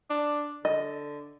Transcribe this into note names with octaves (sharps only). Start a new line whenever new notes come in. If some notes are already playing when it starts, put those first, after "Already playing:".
D4
D3 D#5